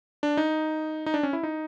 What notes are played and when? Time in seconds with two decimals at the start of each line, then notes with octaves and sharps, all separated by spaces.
0.23 D4
0.37 D#4
1.06 D#4
1.14 D4
1.23 C#4
1.33 E4
1.43 D#4